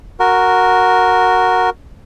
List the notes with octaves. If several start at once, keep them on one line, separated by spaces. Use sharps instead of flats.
F#4 A#4